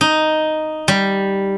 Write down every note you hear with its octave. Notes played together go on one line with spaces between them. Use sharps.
D#4
G3